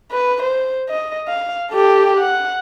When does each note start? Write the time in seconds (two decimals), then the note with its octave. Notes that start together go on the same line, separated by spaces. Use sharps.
0.12 B4
0.43 C5
0.89 D#5
1.28 F5
1.71 G4 A4
2.17 F#5